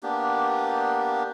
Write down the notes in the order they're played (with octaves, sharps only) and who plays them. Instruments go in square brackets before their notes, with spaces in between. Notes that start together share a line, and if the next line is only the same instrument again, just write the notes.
[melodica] A#3 B3 D4 G4